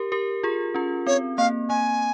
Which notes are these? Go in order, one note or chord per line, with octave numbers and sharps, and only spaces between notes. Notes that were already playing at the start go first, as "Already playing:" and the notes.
Already playing: G4 A#4
G4 A#4
F4 G#4
C#4 F4
C4 C#5
A#3 F5
A#3 G#5